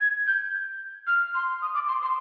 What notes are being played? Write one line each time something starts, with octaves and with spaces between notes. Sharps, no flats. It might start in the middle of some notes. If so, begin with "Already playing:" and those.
G#6
G6
F6
C6
D#6
D6
C6
C6